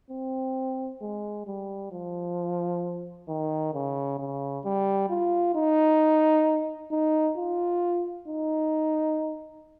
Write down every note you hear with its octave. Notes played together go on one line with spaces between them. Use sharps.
C4
G#3
G3
F3
D#3
C#3
C#3
G3
F4
D#4
D#4
F4
D#4